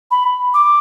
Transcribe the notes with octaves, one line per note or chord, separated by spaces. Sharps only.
B5
D6